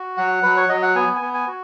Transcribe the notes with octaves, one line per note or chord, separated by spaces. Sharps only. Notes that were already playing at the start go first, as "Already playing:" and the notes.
Already playing: F#4
F#3 F#5
F#3 B4
C#5
F#3 D#5
F#5
B3 G#5
G#5
B3
G#5
F#4